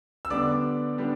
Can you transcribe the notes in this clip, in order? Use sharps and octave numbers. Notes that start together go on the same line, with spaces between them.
E6
D3 G3 B3 D4 D5 D6
D3 G3 B3 D4